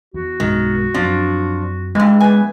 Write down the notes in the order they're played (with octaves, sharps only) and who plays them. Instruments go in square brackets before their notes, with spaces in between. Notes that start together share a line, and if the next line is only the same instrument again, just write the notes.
[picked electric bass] E2 [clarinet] F#4
[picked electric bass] B1 G2 G#3 [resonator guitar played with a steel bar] D#3
[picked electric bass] F#2 F#3 C4 [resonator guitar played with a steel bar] F3 D4
[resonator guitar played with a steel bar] G2 E3 [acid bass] G#3
[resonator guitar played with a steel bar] E2 G#5 [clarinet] B4